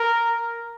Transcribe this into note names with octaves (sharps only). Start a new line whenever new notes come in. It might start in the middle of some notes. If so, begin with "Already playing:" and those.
Already playing: A#4